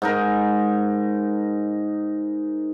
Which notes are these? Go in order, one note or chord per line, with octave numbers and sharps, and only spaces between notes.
G#2 D#4 A#4